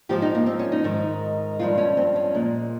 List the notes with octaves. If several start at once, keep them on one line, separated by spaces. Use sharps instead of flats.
G#2 F3 G#3 G4
D#4
A#3
C4
C#4
D#4
G#2 D#3 G#3
G2 F3 G#3 F4
C#4
C4
C#4
A#2 G#3